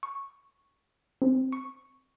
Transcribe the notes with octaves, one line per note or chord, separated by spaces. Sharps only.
C#6
C4
C#6